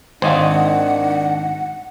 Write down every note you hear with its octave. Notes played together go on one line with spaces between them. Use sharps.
G#1 D#3 D4 C5 D#5 F5 F#5